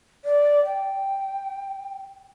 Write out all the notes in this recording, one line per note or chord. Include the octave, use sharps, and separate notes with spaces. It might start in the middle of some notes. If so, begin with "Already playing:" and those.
D5
G5